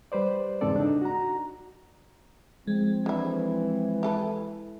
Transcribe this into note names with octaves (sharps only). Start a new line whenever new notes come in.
G3 B4 C5 D5
E2 G#2 C#3 C4 A4 D5
D4 D#4
F#4 A#5
F3 G#3 C4
D3 E3 E4
E4 A4 B4